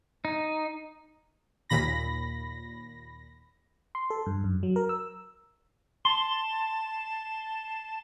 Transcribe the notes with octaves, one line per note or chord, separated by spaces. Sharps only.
D#4
D#2 A#2 B5 A#6
C6
A4
G2
F#2
F#3
A#4
E6
A5 C6